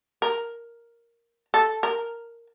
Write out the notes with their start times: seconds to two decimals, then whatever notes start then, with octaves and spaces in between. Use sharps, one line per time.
0.22 A#4
1.54 A4
1.83 A#4